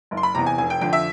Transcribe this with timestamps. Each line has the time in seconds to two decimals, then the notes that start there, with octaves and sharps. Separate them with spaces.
0.11 F#1
0.17 C6
0.23 B5
0.35 E2 C3 A#5
0.46 G#5
0.58 F1 G#5
0.70 G5
0.81 F2 D3 G5
0.93 E5